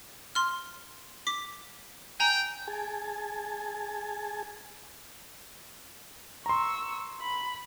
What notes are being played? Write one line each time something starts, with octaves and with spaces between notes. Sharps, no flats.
C6 F6
D6 B6
G5 G#5 A#5
G#4 G#5 A5
A#5 C6 C#6 E6
B5